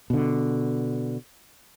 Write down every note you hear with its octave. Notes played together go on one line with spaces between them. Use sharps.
B2 D3